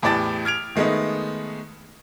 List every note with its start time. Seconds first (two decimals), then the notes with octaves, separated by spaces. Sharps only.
0.02 E2 A2 G4 D5 A5 A6
0.45 F6 G#6 D7 F7
0.76 D#3 G#3 A3 B3 D#4